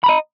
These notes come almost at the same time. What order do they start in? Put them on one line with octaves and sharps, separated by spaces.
B5 A#5 D#5